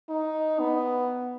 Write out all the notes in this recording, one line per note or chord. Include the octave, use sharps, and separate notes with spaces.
D#4
B3